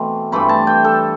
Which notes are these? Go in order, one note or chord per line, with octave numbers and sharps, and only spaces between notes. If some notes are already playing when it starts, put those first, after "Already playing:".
Already playing: B2 E3 A3 C4
G2 E3 A3 C4 B5
A5
G5
A4